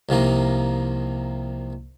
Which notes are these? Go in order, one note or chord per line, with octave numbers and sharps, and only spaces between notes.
C2 C3 F3 A#3 D#4